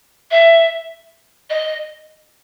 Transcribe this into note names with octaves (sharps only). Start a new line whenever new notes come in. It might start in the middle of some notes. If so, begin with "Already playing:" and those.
E5
D#5